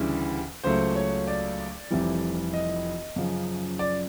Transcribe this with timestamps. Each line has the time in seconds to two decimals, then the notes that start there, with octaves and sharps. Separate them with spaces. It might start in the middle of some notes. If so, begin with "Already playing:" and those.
Already playing: D2 C#3 E3 G3
0.64 C#2 C#3 F#3 A3 C5
0.96 C#5
1.27 D5
1.91 F1 F2 C3 E3 G3
2.54 D#5
3.16 F#2 C#3 F3
3.79 D5